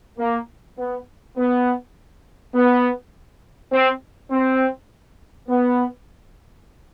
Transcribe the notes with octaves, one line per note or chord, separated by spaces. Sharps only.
A#3
B3
B3
B3
C4
C4
B3